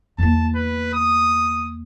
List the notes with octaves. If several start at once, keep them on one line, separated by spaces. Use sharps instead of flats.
E2 A#3 A5
B4
D#6